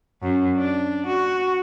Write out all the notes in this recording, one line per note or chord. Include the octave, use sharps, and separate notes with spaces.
F#2
D4
F#4